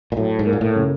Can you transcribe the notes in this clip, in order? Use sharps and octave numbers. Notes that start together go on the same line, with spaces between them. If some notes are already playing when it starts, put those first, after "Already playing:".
A#2
A2 F#3
G#2
A#3
A#2
A2
C#3